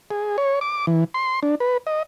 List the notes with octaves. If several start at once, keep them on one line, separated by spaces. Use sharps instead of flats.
G#4
C#5
D6
E3
C6
D4
B4
D#5